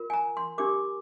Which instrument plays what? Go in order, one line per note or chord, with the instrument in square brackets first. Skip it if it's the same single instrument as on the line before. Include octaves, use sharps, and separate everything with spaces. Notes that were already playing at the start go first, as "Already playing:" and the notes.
Already playing: [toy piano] F4 A#4
G#5
A#5
C6
D4 G4 A#4 D6